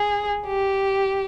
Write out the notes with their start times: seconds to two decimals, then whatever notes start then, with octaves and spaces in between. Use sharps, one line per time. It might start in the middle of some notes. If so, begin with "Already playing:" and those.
Already playing: G#4
0.46 G4